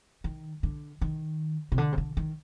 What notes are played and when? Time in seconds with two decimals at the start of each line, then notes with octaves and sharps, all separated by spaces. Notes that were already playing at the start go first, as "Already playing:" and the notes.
0.24 D#3
0.63 D3
1.01 D#3
1.72 C3
1.78 D3
1.92 C3
1.98 D3
2.17 D#3